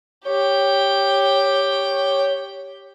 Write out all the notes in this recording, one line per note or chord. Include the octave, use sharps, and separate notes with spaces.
G4 C#5 G5